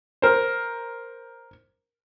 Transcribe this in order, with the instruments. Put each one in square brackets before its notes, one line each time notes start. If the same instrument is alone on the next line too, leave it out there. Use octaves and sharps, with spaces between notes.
[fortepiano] A#4 C5